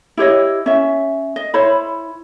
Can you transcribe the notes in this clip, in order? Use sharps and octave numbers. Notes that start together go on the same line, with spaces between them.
E4 G4 C#5 D#5
C#4 E5
D#5
E4 C5 C#5 B5